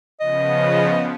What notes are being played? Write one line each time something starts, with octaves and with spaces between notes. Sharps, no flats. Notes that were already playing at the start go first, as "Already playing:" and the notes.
C#3 F3 B3 D#5